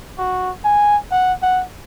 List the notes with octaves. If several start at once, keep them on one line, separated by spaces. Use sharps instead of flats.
F#4
G#5
F#5
F#5